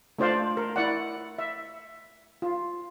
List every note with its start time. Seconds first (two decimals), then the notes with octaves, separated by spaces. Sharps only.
0.19 A3 D4 F4 C5 D5 F5
0.57 A#4
0.76 E4 D5 F#5
1.39 E5
2.42 F4